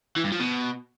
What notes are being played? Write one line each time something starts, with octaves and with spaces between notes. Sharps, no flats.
E3
G2
F3
B2